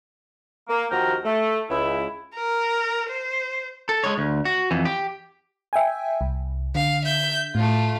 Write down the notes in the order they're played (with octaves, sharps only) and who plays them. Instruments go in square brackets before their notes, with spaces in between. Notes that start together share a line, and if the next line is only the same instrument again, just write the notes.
[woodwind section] A#3
D#2 F3 F#4 G5 A#5 F6
A3
C#2 E4
[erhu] A#4
C5
[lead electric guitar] A4
G#3 C#5
D2
F#4
F2 E3
G4
[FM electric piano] E5 G5 G#5
C2
[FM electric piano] D3 [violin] F5
[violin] E5 G6
[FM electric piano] A2 [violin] A3 F4